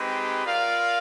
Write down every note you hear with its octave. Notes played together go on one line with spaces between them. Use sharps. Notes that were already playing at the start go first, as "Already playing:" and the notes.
Already playing: G#3 C4 D#4 G4 B4
F4 A#4 D5 F5